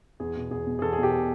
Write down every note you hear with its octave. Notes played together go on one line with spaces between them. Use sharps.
E2 G#4
B2
E2 G#4
B2
G#4
E2 A4
G#4
B2
G4